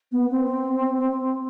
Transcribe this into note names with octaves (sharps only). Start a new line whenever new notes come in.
B3
C4